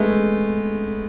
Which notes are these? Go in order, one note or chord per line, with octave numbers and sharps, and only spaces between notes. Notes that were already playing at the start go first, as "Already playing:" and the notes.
Already playing: G#3 A3 B3